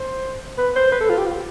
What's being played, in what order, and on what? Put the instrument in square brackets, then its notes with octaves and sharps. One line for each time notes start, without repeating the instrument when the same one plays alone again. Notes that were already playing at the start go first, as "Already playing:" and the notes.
Already playing: [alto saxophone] C5
B4
C5
B4
A4
F4
G4
F4